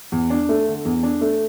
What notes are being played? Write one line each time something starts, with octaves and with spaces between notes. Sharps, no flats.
E2
D4
A3
D3
E2
D4
A3